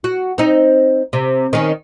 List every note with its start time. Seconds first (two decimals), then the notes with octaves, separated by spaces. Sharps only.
0.04 F#4
0.38 C4 D#4
1.13 C3
1.53 D#3 C#4